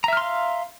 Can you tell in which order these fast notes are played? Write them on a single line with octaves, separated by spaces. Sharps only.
A#5 E5 F6 C6 F5